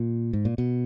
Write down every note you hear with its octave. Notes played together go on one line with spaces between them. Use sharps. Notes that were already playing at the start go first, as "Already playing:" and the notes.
Already playing: A#2
G#2
A#2
B2